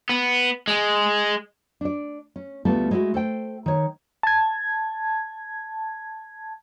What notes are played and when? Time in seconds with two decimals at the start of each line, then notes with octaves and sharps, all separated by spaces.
0.09 B3
0.68 G#3
1.81 D4 D5
2.36 C#4
2.65 D2 G3 A3 B3 F4 A4
2.91 G#3 A3 C#4 E4 F#4
3.14 A4 C5 G5
3.66 D#3 C#5
4.23 A5 G#6